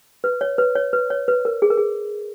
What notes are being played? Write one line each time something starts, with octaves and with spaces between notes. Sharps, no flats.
B4
C#5
B4
C#5
B4
C#5
B4
A#4
G#4
A#4
G#4